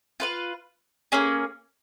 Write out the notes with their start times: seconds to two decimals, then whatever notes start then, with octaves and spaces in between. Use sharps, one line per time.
0.20 F4 B4 F5
1.12 A#3 C#4 G#4